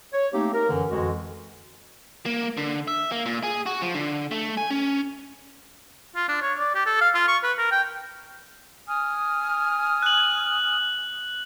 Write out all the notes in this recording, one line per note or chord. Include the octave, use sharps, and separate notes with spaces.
C#5
A3 A#3 C4 D#4 G4
A#4
F#2 D3 E3
F2 D3 E3 G#3 F#4
A#3
D3
E5
A#3
A#2
G#4
F#4
F3
D3
A3
G#5
C#4
F4
D4
C#5
D5
G4
A4
F5
F4
C#6
B4
A#4
G5
G#5 D#6 F6
F#6 F#7